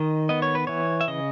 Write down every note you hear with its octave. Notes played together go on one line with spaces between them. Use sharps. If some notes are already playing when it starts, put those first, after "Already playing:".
Already playing: D#3 D#5
B3 D#5
C#5
B4
E3 C#5
E5
C#3 D#5